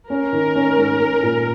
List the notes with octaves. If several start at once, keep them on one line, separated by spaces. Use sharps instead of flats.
C#4 A#4
D#3
C#4
G#2
C#4
A#2